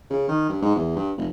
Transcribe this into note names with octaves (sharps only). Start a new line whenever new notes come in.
C#3
D#3
G2
G#2
E2
G2
F1